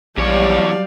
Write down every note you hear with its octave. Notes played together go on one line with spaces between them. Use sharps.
A#1 E2 F#3 G3 C#5 D5 F5